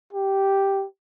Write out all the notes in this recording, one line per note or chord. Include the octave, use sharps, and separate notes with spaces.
G4